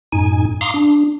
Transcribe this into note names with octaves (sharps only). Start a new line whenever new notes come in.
F#2 A2 D#4 G#5
F5 A#5 C6 D6 D#6
D4